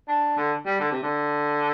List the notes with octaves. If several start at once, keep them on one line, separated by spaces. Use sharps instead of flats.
D4
D3
G3
D3
C3
D3